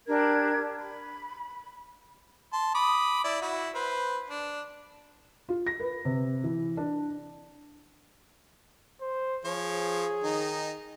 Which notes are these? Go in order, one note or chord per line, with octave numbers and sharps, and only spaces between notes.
D4 G4 A#4 G#6
B5
A5 C6
B5 D6 D#6
E4 D5
E4 F#4
B4 C5
D4
F4
A#6
B4
C3
E3
D4
C5
F3 G#4 C#5
D#3 D#4